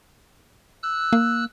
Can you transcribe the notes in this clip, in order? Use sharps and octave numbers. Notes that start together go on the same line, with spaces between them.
E6 F#6
A#3